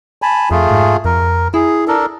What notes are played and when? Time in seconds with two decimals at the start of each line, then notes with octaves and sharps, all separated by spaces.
0.22 G#5 A5 B5
0.51 F2 A3 F4 G#4
0.71 G#2
1.05 F2 A#4
1.54 E4 G#4
1.88 D4 A4 A#4